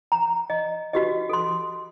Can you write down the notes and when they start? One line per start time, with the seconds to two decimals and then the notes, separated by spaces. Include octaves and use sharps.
0.12 A#5
0.50 D#5
0.93 F#4 G4 D#5
1.29 A4 C6